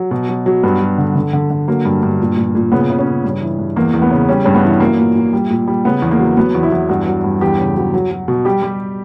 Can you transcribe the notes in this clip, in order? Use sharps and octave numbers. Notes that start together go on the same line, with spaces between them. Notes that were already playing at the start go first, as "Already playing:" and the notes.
Already playing: F#3
B2
F#3
F#3
G2 B3
F#3
D3
D3
D3
D3
F#3 A#3
G2
G2
A#2
A#2
A#2
C#3 B3
C#3
C#4
C#3
G2
E3
G2
E2 A#3
E2
B3
C#3
G3 C#4
G2 C#4
B3
E3
F#3 A#3
A#2
A#2
G3
A#2
G3
C#3 B3
E2
A#3
F#3
F#3 B3
E2
E4
E2
G2 F#4
F#3
G2
E2 G4
C#3
F#3
F#3
F#3
B2
G3 G4
G3